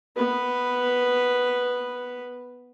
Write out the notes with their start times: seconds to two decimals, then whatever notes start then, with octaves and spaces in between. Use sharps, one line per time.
0.16 B3 B4